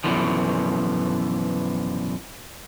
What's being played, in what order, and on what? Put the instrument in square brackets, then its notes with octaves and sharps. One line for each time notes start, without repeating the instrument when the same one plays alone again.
[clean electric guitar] F#2 B2 D3 E3 F3